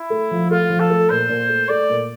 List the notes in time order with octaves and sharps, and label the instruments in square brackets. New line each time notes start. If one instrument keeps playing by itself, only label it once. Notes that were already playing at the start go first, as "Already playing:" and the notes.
Already playing: [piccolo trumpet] E4
[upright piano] A3
F3
[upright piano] A3 [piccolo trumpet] F4
[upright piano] F3
[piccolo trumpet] A4
[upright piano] A3
[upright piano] A#2 [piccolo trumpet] C5
[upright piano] A#2
A3
[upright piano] A3 [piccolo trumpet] D5
[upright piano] A#2